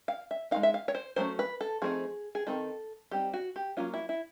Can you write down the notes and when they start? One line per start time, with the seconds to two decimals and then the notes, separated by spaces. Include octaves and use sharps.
0.08 F5
0.31 E5
0.51 G#3 C4 D#4 F5
0.63 E5
0.74 F5
0.88 C#5
0.95 C5
1.16 F#3 A3 C#4 C5
1.39 B4
1.61 A4
1.82 F3 A3 C4 D#4 G#4
2.35 G#4
2.46 D#3 G3 C4 D#4 A4
3.11 G3 C4 D#4 G4
3.34 F#4
3.56 G4
3.77 F#3 A#3 C#4 F4
3.94 E4
4.09 E4